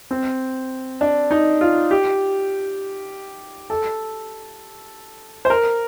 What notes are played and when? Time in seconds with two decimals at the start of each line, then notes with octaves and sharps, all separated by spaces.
0.11 C4
1.01 D4
1.31 D#4
1.61 F4
1.91 G4
3.70 A4
5.45 C5
5.50 A#4